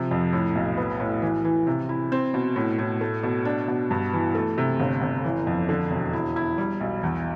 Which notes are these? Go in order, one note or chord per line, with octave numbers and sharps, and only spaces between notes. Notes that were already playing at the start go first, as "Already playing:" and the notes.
Already playing: C3 F3
F2
A2
B1
B3
A2
E3
E3
C3
E4
C4
B2
A2
A2
A3
B2
D4
B2
G2
E3
A3
C3
G1
G1
E3
F2
D3
E1
E4
E4
G3
B1
E2